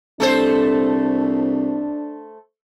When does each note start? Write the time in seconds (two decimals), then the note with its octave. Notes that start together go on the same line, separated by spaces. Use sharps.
0.20 C2 A3 D4 A4 C5